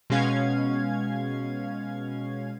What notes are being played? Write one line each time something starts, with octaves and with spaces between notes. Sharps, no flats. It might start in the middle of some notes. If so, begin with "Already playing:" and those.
B2 G#3 C#4 F5 G#6